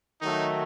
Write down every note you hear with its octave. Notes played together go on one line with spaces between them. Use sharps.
D#3 F#3 A3 D#4